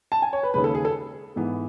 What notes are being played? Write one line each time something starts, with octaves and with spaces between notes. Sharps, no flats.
A5
G#5
C#5
B4
D#2 C#3 G#3 B4
A4
G#4
A4
G#2 E3 B3